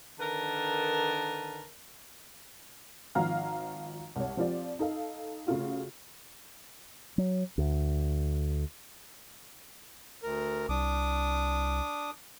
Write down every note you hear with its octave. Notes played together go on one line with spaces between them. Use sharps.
D3 D#3 A#4 B4 A5
G#1 F3 F5 F#5 A#5 F6
C2 C#5
F3 C4 F4 G4 D5
D#4 A4 F5
C#3 A3 F4 F#4
F#3
D2
D2 A#4
C2 D4 D6 D#6